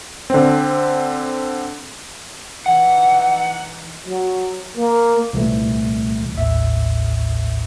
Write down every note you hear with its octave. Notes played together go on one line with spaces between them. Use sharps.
D3 C4
E3 D#4 F#5
F#3
A#3
C2 A#2 E3 G3 A3
A1 D#2 A2 E5